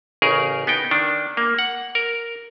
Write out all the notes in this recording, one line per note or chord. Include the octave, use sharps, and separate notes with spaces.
A1 C#3 G#4 A#4
B3 D#4 G5
D#3 D4
A#3
F#5
A#4